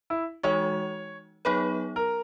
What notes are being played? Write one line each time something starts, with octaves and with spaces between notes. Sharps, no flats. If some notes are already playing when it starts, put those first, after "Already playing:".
E4
E3 G#3 D#4 F#4 C#5
F#3 B3 D#4 G#4 B4 C#5
A#4